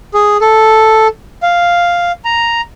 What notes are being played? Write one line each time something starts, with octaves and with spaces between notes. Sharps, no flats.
G#4
A4
F5
A#5